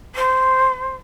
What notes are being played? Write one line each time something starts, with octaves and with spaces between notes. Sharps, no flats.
C5